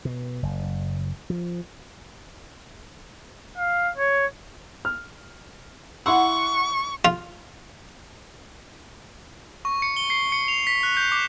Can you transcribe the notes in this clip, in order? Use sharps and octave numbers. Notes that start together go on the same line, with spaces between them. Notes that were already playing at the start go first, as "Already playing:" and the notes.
B2
F#1
F3
F5
C#5
F6
E4 F#5 C6 C#6 E6
F4
C#6
C#7
G7
C7
C#7
F7
B6
F#6
G6
D6